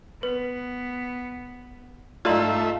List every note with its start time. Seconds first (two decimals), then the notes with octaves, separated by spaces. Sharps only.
0.23 B3 B4
2.25 G#2 A3 D#4 F4 D5 E5 A#5 C6